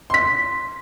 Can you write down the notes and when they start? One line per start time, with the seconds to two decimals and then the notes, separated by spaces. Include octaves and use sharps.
0.10 C6 B6